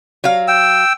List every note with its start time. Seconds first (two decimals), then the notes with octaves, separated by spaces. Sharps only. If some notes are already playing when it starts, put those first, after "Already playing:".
0.24 F#3 F5
0.48 G5 E6